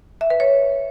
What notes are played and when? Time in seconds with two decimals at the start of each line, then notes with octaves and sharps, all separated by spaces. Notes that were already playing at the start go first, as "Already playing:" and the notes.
0.21 E5
0.30 B4
0.40 C#5